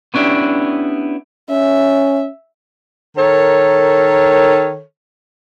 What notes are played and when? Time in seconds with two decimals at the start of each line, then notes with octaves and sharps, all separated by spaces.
0.14 B3 C#4 D4 E4 G4
1.50 C#4 E5
3.17 D#3 A4 A#4 C#5